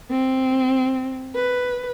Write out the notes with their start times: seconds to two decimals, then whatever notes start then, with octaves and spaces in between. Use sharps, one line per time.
0.10 C4
1.35 B4